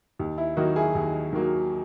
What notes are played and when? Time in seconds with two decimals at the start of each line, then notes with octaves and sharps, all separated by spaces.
0.19 D#2
0.38 E4
0.57 D#3 F#3 A#3 D#4 F#4
0.76 E4 G#4
0.95 D#2
1.33 D#3 F#3 A#3